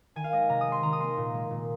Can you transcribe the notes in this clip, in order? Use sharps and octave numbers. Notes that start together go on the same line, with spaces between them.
D#3 G#5
F5
G#3 D#5
G#5
C3 A#5
D#6
G#3
C6
D#3 A#5
D#6
A#3 C6
A#2
G#3
A#2